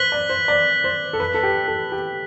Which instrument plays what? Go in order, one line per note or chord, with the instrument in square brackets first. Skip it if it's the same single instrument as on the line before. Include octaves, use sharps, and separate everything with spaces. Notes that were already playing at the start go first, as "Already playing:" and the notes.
Already playing: [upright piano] B4 C5 [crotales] F#6 B6 F#7
[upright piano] D5
C5
D5
C5
A4
B4
A4
G4
A4
G4